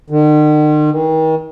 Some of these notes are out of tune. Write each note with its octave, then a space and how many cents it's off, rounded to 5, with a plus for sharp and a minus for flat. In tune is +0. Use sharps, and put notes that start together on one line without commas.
D#3 -45
D#3 +40